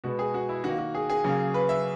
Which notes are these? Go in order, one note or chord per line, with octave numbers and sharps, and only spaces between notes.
B2 G#3 B3 F#4
G#4
F#4
E4
D#3 A#3 F#4
F#4
G#4
G#4
C#3 F#3 A#3
B4
E5